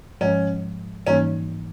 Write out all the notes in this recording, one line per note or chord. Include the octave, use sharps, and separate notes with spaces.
G#2 F3 G#3 C#4
G#2 E3 G3 A#3 C#4 D#4